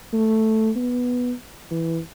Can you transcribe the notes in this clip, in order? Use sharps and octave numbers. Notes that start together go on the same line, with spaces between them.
A3
B3
E3